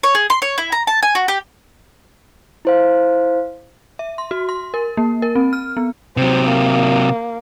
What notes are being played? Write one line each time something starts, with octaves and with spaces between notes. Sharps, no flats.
C#5
G#4
C6
C#5
E4
A#5
A5
G#5
F#4
G4
E4 C5 F5
E5
C6
F#4
C6
A#4
A#3
A#4
C4
F6
B3
C3 F#3 C4
A#3